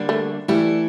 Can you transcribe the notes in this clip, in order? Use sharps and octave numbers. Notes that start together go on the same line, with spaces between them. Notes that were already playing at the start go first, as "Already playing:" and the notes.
Already playing: D3 G3 A#3 D4
A3
E3 G3 A3 E4 A4